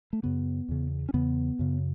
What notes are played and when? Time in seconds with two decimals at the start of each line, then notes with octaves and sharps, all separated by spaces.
0.13 A3
0.23 F#2 C#3 B3
0.69 E2 C#3
1.09 C#4
1.14 E2 C#3 B3
1.59 F#2 C#3